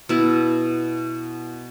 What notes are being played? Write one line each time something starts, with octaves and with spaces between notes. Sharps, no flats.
B2 E4